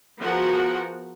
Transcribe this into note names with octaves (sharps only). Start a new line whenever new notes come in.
F3 B3 F#4 G#4 A#4 F#5